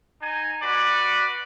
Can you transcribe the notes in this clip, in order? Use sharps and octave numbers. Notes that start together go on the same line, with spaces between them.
D#4 G#5
F#4 B4 D5